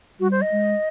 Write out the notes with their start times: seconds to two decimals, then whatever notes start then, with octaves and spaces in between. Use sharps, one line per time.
0.20 G3 F#4
0.31 C5
0.41 D#5
0.52 G#3